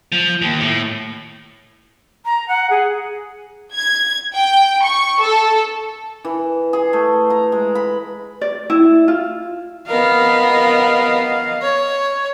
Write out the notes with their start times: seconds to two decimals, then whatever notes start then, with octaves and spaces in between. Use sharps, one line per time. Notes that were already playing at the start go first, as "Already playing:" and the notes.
0.12 F3
0.41 D#2
0.60 A2
2.25 A#5
2.48 F#5
2.70 G#4
3.74 G#6
4.34 G5
4.84 C#6
5.20 A4
6.25 E3
6.73 G#4
6.93 A3
7.30 A#5
7.52 G#3
7.75 B5
8.41 D5
8.70 E4
9.08 F4
9.88 B3 A#4 D#5 F5
11.61 C#5